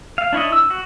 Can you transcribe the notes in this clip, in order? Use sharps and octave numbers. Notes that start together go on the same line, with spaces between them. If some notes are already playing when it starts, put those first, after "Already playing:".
F5
D4 E4 C#5 D#5
E6
F#4